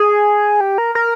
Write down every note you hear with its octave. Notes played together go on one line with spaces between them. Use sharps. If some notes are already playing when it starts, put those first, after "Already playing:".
Already playing: G#4
G4
A#4
A#4